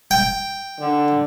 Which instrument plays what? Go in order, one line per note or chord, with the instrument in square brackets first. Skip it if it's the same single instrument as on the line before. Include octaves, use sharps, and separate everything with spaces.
[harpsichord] G5
[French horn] D3